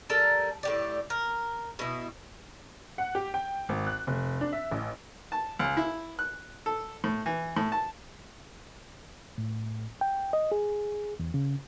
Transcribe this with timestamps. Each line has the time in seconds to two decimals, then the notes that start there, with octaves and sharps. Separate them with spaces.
0.09 G3 A4 A#4 A5
0.63 A2 G4 D5
1.10 A#4
1.79 B2 E4
2.98 F#5
3.15 G4
3.34 G5
3.69 G#1
3.87 F#6
4.07 F1
4.41 D4
4.53 E5
4.71 A1
5.32 A5
5.59 C#2
5.77 E4
6.19 F#6
6.66 A4
7.04 A2
7.26 E3
7.57 A2
7.72 A5
9.38 A2
10.01 G5
10.33 D#5
10.52 G#4
11.20 E2
11.34 C#3